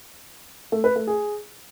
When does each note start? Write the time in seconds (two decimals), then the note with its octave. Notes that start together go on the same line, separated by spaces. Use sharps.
0.72 A3
0.84 B4
0.96 A3
1.07 G#4